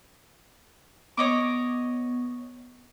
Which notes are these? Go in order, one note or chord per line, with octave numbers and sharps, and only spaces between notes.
B3 C#5 D#5 D6